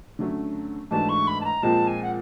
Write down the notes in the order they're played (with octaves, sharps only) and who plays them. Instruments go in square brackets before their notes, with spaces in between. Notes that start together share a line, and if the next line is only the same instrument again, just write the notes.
[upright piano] D3 F#3 A3 C#4
[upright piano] G#2 E3 A3 D4 F#4 [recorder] A5
[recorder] C#6
B5
A5
A#5
[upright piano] A#2 F3 G#3 C4 [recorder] A5
[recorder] G#5
F#5